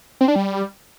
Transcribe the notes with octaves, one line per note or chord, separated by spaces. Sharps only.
C4
D4
G3